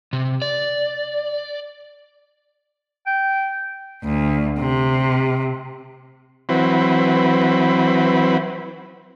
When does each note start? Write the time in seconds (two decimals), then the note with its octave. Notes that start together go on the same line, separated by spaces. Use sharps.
0.13 C3
0.42 D5
3.07 G5
4.04 D2
4.59 C3
6.49 E3 F#3 C4 B4